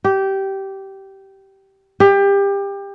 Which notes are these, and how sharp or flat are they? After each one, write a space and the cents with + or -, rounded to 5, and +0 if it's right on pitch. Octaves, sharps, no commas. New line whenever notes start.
G4 -15
G4 +25